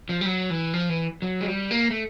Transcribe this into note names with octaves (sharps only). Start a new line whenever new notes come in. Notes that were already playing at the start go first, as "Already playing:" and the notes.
F3
G3
F#3
E3
F3
E3
F#3
G#3
G3
A#3
A3